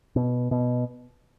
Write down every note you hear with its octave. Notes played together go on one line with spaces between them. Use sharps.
B2
B2